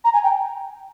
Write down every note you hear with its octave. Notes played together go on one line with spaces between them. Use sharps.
A#5
G#5
G5